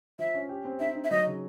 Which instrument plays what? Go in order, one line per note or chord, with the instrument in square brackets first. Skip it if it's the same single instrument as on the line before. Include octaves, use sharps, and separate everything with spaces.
[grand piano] F3 [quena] E5
[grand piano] C#4
G4
C4
[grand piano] D#4 [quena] E5
[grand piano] D#4
[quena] E5
[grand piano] F#3 [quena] D#5
[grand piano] C#3